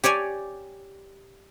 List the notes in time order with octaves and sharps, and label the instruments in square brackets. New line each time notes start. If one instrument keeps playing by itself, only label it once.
[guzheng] G4 C#5 D5 G#5